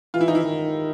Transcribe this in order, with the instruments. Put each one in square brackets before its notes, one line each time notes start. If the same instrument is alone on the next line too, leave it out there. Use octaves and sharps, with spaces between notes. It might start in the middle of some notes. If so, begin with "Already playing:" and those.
[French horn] E3 [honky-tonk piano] F4
[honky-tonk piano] E4
D#4
E4
[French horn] D#3